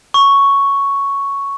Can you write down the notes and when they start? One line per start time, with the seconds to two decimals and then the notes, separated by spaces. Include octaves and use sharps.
0.14 C#6